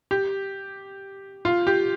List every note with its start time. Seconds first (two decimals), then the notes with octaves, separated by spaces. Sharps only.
0.11 G4
1.45 F4
1.67 G4